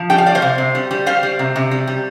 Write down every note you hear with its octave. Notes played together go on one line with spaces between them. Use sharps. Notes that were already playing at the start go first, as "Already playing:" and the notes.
Already playing: F3
G3 G5
F5
G3 D5
C5 F5
C3
C3
G3
G3
G3 C5 F5
G3
C3
C3
G3
G3